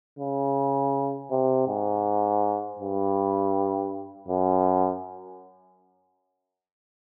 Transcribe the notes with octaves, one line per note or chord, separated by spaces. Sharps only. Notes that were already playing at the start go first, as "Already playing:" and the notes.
C#3
C3
G#2
G2
F#2